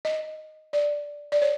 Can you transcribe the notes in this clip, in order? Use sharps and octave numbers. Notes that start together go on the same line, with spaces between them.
D#5
D5
D5
C#5